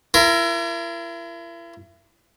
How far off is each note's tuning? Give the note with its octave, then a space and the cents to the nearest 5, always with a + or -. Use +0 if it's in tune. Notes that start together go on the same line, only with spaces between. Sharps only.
E4 +40 A#4 +0